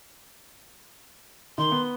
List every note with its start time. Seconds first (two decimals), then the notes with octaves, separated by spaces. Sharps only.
1.58 D#3 C6
1.72 B3